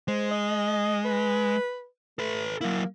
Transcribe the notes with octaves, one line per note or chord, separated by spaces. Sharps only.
G#3 C5
D#5
B4
A3 A4 B4
F#3 A#3 E4